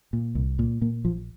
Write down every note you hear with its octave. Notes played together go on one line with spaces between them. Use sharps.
A#2
C2
A#2
A#2 A#3
A#1 F3